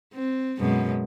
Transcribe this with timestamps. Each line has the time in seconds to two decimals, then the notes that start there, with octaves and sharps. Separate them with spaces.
0.14 C4
0.59 F#2 B2 G#3